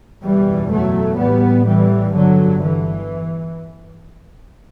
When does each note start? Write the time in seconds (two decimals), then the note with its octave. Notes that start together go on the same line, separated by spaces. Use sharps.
0.22 F#1 E2 B2 E3 G3
0.71 F#3 A3
1.18 A1 A2 G3 B3
1.66 E3 G3
2.14 G1 G2 D3 F#3
2.61 E3